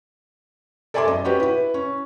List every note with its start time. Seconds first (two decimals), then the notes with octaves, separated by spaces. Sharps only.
0.94 A4 D5 E5 G#5 C6 D6
1.07 F#2 D#5
1.25 C#4 F#4 G4 B4
1.40 E4 B4
1.74 C#4